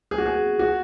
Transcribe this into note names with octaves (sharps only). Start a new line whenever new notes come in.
G#4
F#4
G#4
F#4